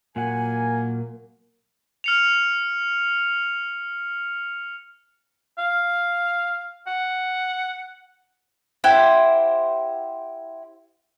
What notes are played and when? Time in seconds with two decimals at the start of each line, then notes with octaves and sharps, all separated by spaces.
0.16 A#2 F#3 A#3 F#5 G#5
2.04 F6 C#7 F7
5.58 F5
6.87 F#5
8.84 E4 G4 C5 F#5